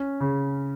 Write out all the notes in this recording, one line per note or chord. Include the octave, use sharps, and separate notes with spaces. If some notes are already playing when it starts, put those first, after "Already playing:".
Already playing: C#4
C#3